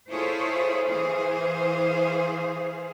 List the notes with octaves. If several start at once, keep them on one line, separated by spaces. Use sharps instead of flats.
E4 F4 G#4 A4 C5 C#5
E3 G#4 C5 F5